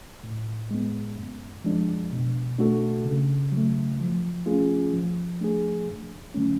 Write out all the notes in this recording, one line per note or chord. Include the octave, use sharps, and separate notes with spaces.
A2
G#3 B3
F#2
F3 G#3 D4
B2
A3 D4 F#4 A4
C#3
F#3 A3
F3
A3 C#4 F4 G#4
F3
A3 D4 G#4
F#2
D3 F#3 A3 C#4